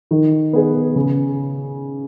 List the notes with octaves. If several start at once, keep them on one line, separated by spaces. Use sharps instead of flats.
D#3
B3 G#4 B4
C#3